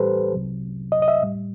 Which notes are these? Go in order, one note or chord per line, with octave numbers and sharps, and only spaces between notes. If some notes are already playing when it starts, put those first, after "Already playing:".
Already playing: A2 E3 G3 G4 A4 B4 C5
C2 C3 F#3
D#5
D#5
E5
A2 G3